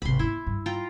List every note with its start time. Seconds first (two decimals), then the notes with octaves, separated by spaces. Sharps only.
0.02 G#1 C3 B5 C6
0.19 G#3 A#3 E4
0.47 G2
0.66 F4 G5 A#5